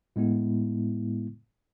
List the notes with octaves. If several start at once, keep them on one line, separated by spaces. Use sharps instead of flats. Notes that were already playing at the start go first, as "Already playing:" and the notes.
A2 G#3 B3 E4